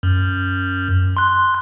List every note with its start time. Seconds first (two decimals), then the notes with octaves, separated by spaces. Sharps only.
0.03 F#2
1.17 C6 F#6